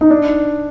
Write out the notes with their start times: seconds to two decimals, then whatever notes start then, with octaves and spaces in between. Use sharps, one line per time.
0.01 D#4
0.10 D4